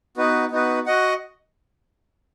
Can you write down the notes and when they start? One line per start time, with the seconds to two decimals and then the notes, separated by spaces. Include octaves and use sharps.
0.17 B3 D#4 F#4 B4
0.51 B3 D#4 F#4 B4
0.86 F#4 D#5 F#5